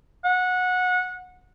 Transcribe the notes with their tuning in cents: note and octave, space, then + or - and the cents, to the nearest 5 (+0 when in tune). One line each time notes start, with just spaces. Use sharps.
F#5 -20